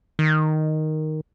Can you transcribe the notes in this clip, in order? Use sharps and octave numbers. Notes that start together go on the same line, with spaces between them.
D#3